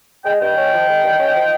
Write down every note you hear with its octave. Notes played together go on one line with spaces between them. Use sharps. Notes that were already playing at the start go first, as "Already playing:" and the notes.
G#3 G5
G2 D#5 G5
C#4
F3
G#3
G2
C#4
F3